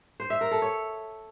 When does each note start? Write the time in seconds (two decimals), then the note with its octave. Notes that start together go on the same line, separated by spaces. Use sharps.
0.20 C5
0.30 E5
0.41 A#4
0.51 A4
0.62 C#5